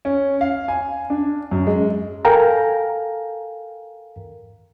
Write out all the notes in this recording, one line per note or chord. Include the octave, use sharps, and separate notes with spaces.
C#4
F5
G#5
D4
F#2
G#3
A4 A#4 F5 G5 G#5 A#5